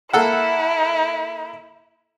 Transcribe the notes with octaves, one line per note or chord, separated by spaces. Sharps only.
A#3 E4 A4 F#5